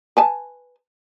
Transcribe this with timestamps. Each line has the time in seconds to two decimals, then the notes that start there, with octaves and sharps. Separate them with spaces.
0.17 B4 G#5 A5